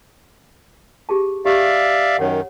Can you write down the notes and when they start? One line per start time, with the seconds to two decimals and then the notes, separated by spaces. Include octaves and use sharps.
1.09 G4 G#4 A5
1.45 G4 D5 E5 F5
2.19 F#2 D#3 C#5 F#5